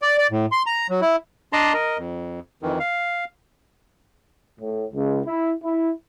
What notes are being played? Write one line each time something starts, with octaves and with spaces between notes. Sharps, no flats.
D5
D5
A2
C6
A#5
F#3
E4
D4 D5 D#5 A5 A#5 C6
A#4 D#5
F2
F2 D#3 E3
F5
A2
C#2
E4
E4